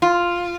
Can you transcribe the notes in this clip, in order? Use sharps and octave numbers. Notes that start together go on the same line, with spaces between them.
F4